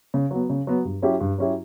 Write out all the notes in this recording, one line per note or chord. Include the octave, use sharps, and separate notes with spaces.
C#3
F#3 B3
C#3
F#3 B3
G2
F#3 C#4 E4 G4
G2
F#3 C#4 E4 G4